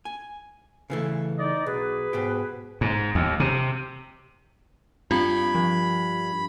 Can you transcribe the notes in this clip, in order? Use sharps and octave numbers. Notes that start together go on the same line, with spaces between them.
G#5
C#3 E3 A3
D#4 D5 D#5
B1 G#4 B4
G#2 B2 G4
G#2
D#2
C3
G2 C4 F4 B5
F3